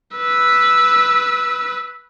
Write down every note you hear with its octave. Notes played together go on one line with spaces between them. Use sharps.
B4 E6